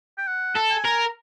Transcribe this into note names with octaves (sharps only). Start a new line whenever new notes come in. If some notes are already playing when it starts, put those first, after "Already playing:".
G5
F#5
A4
G#5
A#4